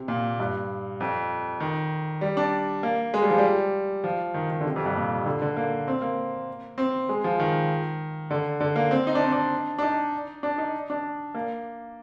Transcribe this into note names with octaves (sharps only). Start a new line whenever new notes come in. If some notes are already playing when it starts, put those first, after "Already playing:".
Already playing: C3
A#2
G2
F2
D#3
G3
D4
A#3
G#3
G3
F3
G3
F3
D#3
D#3
D3
C3
F2
G2
A#2
D3
D3
A#3
C4
A#3
C4
G#3
F3
D#3
D3
D3
A#3
C4
D#4
D4
C4
D4
D4
D#4
D4
D#4
D4
A#3